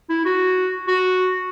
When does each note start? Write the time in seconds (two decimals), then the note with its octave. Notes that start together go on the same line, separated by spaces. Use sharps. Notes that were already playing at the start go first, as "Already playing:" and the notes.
0.09 E4
0.25 F#4
0.87 F#4